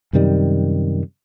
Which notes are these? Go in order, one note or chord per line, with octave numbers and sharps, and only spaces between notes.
F#2 C3 D#3 G3